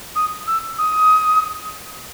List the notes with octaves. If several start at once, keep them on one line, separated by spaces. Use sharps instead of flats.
D#6
E6
D#6